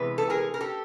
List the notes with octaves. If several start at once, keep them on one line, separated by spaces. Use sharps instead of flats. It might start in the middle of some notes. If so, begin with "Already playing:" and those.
Already playing: C3 E3 G#3 B3 B4
A4
G#4 A#4
A#4
G4 A4